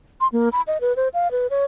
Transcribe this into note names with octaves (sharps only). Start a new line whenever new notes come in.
C6
A#3
B5
D#5
B4
C5
F5
B4
C#5